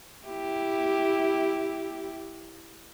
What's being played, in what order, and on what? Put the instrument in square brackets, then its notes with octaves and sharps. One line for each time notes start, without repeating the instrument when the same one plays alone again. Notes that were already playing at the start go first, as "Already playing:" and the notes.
[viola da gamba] E4 G4